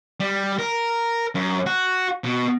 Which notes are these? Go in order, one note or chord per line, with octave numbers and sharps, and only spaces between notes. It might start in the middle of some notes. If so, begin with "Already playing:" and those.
G3
A#4
F#2
F#4
B2